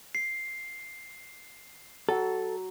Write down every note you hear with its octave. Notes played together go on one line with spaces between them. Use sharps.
C7
F#3 A4